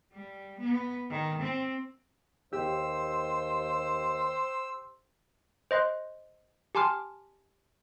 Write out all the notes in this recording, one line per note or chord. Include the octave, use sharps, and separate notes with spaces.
G3
B3
D#3
C4
D#2 G4 C5 E6
C5 D#5 C6 F#6
G4 G#5 A5 C6 D6 F6